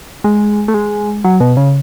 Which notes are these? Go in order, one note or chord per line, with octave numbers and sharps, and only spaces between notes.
G#3
A3
G#3
F#3
B2
C#3